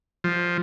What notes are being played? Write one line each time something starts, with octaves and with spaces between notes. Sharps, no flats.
F3